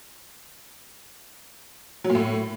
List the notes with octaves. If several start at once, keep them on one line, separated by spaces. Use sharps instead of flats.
F#3
A#2
A2